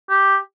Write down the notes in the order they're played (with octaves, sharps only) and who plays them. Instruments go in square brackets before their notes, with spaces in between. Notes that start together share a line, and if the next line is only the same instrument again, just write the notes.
[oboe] G4